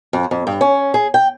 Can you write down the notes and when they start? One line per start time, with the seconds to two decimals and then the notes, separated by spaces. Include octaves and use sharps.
0.13 F2
0.31 F2
0.47 G2
0.61 C#4
0.94 G#4
1.14 G5